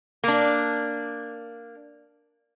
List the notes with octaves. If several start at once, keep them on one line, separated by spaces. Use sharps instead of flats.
A#3 D4